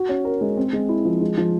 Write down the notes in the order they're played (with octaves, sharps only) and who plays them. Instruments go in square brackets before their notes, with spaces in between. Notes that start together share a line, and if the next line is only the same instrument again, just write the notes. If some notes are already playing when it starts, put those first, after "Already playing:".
Already playing: [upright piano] F#4
C#4
A#4
G#3
C4
G#3
E4
F3
G#3
F3